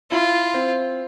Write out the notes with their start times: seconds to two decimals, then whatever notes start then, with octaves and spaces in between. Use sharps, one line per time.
0.11 E4 F4
0.54 C4